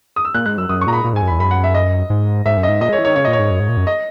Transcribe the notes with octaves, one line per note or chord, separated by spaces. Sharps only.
D#6
E6
A#2 F#6
G#2 F#6
F#2 E6
F#2 D#6
C#6
A#2 A#5
B5
A#2
G#2 G#5
F#2
B5
E2
F#2 B5
F#5
E5
D#5
G#2
G#2 E5
F#2
D#5
G#2
A#2 D#5
G#3
C#5
E3
D#3 C#5
C#3 C#5
A#2 D#5
C#5
G#2
F#2
G#2
A#2
F#2
D#5